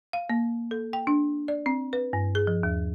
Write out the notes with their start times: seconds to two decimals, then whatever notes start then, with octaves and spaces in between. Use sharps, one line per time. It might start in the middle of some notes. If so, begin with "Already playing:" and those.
0.13 F5
0.30 A#3
0.71 A4
0.93 G5
1.07 D4
1.48 D5
1.66 C4
1.93 B4
2.13 G2
2.35 G#4
2.47 F3
2.63 D#2